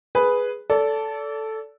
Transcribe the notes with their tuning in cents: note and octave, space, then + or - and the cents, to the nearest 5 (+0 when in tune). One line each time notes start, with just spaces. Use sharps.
G#4 +0 B4 +0
A4 +0 D5 -35